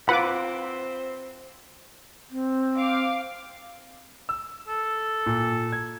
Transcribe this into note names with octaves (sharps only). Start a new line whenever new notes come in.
C4 F4 B4 F#5 B5 D6
C4
F5 D6
E6
A4
A#2
G#6